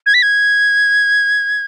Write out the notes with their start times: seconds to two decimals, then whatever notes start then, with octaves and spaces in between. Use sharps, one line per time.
0.06 G#6
0.14 B6
0.22 G#6